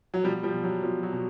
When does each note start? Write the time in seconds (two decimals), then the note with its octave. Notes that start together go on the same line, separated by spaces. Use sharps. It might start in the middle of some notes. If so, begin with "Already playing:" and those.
0.14 F#3
0.24 B2 F3 G3
0.43 F3 G3
0.53 B2
0.64 F#3
0.83 B2 F3
1.03 F#3
1.13 B2